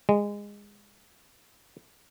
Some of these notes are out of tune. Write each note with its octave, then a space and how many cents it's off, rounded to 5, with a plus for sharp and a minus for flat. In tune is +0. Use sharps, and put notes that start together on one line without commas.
G#3 -20